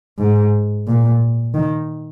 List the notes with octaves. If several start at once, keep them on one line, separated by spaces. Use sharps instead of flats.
G#2
A#2
D#3